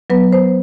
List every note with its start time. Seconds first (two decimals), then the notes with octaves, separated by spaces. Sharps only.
0.10 F#3 B3 B4
0.33 C5